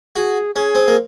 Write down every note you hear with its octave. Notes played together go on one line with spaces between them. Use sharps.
F#4 G#4
C#4 G#4
C4
A#3